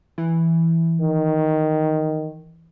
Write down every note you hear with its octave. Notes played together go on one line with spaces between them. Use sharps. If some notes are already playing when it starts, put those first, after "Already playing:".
E3
D#3